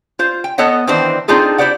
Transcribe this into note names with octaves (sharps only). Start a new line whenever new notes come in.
F4 C5
G5
B3 A4 C#5 D#5 F#5
D#3 E3 C4 D4 C5
C4 D4 D#4 F4 G#4 A4
E4 G4 C5 D5 F#5